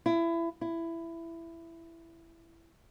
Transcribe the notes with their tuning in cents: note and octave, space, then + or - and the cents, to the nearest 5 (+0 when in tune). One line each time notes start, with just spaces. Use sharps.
E4 +25
E4 +15